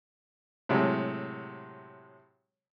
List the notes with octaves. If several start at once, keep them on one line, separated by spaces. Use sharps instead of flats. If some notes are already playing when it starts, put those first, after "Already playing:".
A2 C3 F#3 G#3